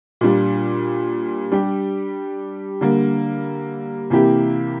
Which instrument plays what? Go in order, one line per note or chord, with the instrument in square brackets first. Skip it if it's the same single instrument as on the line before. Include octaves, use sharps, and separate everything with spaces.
[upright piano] A#2 G3 D4 F4
G3 D4 G4
D3 G3 A#3
C3 E3 A#3 E4 G4